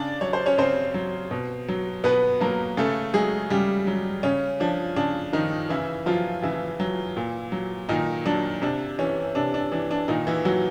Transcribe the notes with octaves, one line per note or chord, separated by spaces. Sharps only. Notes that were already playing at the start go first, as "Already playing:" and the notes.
Already playing: C#3 D4 D5
F#3 C#5
C5
C#4 C#5
C#3 C4 C5
F#3
B2
F#3
B2 B3 B4
F#3 A#3 A#4
C#3 A3 A4
F#3 G#3 G#4
C#3 G3 G4
F#3
C#3 C#4
F3 D4
C#3 D4
D#3 F3 D#4
C#3 E3 E4
F3 F#3 F4
C#3 E3 E4
F#3
A#2
F#3
A#2 D#3 D#4
F#3 D4
C3 D4
E3 C#4
C3 D4
D4
E3 D4
D4
A#2 D#3 D#4
E3 E4
F#3 F#4